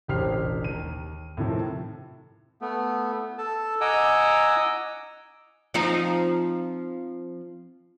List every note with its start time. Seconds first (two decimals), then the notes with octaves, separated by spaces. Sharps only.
0.08 E1 A1 G4 C5 F6 C7
0.64 D#2 D#7
1.37 A2 C3 D#3 F3
2.61 A3 B3
3.38 A4 A5
3.81 D#5 F#5 G#5 A#5 D6 E6
5.74 F3 C4 D#4